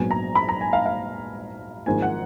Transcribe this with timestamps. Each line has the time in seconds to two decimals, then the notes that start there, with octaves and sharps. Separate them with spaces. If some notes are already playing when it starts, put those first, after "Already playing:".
Already playing: A#1 G#2 F#3 B3 G#5
0.11 A#5
0.35 B5
0.49 A#5
0.61 G#5
0.73 F5
0.86 F5
1.86 G#1 G#2 F3 A#3 G#5
2.02 F#5